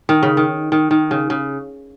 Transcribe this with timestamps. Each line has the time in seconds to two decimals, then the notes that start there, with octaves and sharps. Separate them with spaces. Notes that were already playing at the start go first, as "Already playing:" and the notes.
0.09 D#3
0.23 C#3
0.37 D#3
0.72 D#3
0.91 D#3
1.11 C#3
1.30 C#3